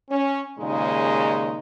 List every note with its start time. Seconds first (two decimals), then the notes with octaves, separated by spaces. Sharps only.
0.10 C#4
0.59 D#2 A#2 C#3 G#3 D#4